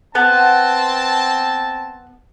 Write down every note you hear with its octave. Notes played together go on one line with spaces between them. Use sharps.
B3 C4 A5